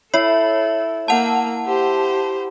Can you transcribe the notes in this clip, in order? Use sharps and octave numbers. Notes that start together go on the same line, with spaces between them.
E4 A4 C#5
A#3 F#5 A5
G4 C5